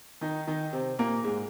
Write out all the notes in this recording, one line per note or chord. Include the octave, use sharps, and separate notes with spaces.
D#3 D#4
D#3 D#4
C3 C4
A#2 A#3
G#2 G#3